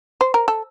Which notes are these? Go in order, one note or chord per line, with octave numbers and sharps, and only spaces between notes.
C5
A#4
A4